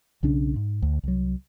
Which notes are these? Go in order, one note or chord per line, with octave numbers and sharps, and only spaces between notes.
B1 C#3 C#4 D4
G#2
D2
C2 F#3